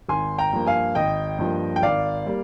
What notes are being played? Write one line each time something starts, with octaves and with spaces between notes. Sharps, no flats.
G#1 G#5 C6
G5 A#5
G2 F3 A#3
F5 G#5
G#1 D#5 G5
G2 F3 A#3
G5
G#1 D5 F5
G3 A#3